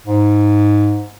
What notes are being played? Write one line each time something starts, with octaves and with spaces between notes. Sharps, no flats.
G#2